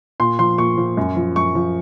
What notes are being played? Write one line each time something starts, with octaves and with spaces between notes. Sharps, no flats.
A#2 C6
F3 C6
A#2 C#6
F3
F#2
F3
F#2 C#6
F3